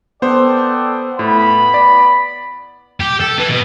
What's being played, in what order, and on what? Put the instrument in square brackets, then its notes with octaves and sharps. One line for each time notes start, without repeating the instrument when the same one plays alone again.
[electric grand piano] B3 C5 [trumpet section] A4 D5 G5
[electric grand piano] A2 [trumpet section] B3 B5
[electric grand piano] D5
[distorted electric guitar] G4
A4
E3
B2